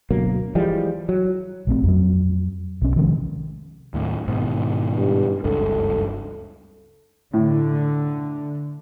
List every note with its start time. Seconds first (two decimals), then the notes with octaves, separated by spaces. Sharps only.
0.11 D2 B2 F#3 A#3
0.55 E3 F3 G3 G#3
1.09 F#3
1.67 A#1 A3 C4
1.84 F2 F#3
2.82 B1 C#4
2.96 C3 D#3 F3 G#3
3.94 D#2 A2
4.28 G#2 B2 D#3
4.94 G2
5.44 F#1 C#2 G2 A4
7.34 A2 D3